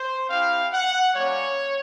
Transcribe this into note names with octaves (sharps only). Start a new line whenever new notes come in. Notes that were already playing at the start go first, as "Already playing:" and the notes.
Already playing: C5
C4 E4 G4 F5
F#5
G3 A#3 C#4 C#5